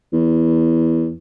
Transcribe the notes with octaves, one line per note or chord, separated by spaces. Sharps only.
E2